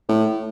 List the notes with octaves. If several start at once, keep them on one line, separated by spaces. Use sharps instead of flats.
A2